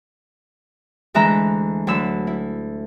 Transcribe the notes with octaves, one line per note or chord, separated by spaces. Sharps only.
D2 E3 G#3 E5 A#5 B5
D2 F#3 B5 E6
E4